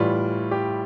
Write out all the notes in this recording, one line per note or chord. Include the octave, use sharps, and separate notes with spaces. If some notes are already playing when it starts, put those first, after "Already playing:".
Already playing: A2 E3 G3 F4
G4